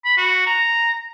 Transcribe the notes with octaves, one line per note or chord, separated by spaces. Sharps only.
B5
F#4
A#5